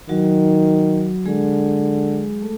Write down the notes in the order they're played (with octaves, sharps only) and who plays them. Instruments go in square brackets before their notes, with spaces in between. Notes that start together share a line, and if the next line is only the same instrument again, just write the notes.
[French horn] D#3 [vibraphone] F#3 F#4
[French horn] D3 [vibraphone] G#3 G#4
[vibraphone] A3 A4